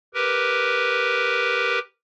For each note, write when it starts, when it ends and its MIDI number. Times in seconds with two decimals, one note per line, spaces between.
0.14 1.79 67
0.14 1.79 70
0.14 1.79 71